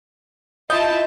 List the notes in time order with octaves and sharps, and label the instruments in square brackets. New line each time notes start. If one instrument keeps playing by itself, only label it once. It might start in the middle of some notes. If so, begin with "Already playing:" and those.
[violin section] E4 F4 A5 [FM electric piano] D#5 G6